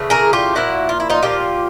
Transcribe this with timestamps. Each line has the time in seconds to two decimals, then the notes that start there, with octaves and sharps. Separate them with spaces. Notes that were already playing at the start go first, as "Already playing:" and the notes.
Already playing: C#3 E3 A3
0.10 G#4 A#4
0.33 F4 G4
0.55 A#2 F3 A#3 E4 F#4
0.89 F4
1.00 E4
1.10 D#4 F4
1.23 A#2 F3 A#3 F4 G4